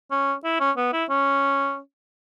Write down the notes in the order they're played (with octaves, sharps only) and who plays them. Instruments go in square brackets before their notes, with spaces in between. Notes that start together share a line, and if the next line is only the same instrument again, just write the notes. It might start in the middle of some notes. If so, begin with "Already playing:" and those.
[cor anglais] C#4
E4
C#4
B3
E4
C#4